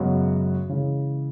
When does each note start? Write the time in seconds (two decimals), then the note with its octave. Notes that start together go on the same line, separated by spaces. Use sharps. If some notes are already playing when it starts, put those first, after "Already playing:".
Already playing: F#2 C#3 G#3 B3 F#4
0.69 C#3 E3 G#3